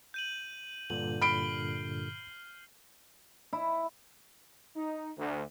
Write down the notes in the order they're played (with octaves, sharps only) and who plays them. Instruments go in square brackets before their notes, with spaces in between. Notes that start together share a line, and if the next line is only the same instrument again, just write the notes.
[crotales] G6 D#7 F#7
[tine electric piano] G2 A#2 D3 [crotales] F#7
[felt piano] B5 D7 [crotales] F6 C7 G7
[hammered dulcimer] E4
[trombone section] D#4
D2